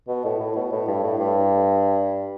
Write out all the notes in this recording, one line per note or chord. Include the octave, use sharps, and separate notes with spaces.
B2
A2
A2
B2
A2
G2
A2
G2